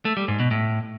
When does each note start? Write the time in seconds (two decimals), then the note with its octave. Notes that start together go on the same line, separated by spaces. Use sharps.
0.05 A3
0.17 G3
0.28 G#2
0.40 B2
0.51 A2